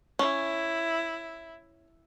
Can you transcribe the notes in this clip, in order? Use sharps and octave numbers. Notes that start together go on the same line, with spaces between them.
C#4 E4